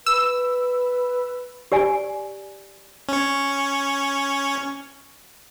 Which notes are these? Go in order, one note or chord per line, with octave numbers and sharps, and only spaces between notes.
B4 E6
G4 D5 G#5
C#4 C#5